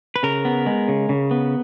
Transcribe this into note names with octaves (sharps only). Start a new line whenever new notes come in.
B4
C#3 A#4
B3
G#3
C#3
C#3
B3